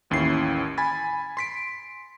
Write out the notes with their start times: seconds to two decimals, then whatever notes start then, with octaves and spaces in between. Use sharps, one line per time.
0.10 A1 D#2 C#4 E4 C7
0.78 G#5 B5 A6
1.37 C6 B6 D7